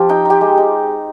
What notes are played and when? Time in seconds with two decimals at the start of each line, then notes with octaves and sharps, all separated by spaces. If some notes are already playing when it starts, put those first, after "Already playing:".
Already playing: F3 C4 F4 G4
0.09 D#4 G5
0.25 D#4 G4 G5
0.41 G#3
0.58 D#4